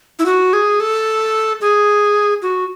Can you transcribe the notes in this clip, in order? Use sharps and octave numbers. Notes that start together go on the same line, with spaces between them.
E4
F#4
G#4
A4
G#4
F#4